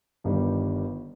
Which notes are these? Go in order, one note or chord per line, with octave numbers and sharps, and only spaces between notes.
G1 G2 D#3 G3